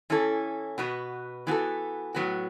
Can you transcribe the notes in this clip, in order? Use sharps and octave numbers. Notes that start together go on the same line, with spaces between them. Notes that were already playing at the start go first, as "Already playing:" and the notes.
E3 C#4 E4 A4
B2 B3 F#4 B4
E3 B3 F#4 A4
A2 F#3 B3 F#4